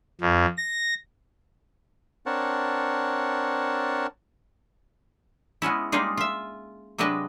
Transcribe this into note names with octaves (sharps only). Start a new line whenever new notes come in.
F2
A#6
C4 D4 A#4 C#5 F#5 A5
G#3 B3 C#4 E4
G3 G#3 A#3 D#4 F4 G#4
F4 E5
C3 F#3 G#3 D4 B4 D#5